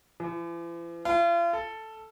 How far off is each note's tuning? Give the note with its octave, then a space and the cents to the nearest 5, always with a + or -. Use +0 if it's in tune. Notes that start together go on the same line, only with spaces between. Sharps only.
E3 +45
F4 -40
A4 +0